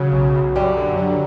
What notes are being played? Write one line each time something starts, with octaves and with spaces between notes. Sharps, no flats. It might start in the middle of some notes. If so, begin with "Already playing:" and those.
Already playing: C#3 F#3
B1
B1
F#2 G3
D3
F#3